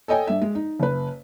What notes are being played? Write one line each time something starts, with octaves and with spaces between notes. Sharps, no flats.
A4 C#5 D#5 G5 G#5
G2 E5
G#3
D#4
F#1 B4